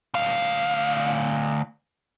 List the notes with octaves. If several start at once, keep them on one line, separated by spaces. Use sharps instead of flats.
D2 F5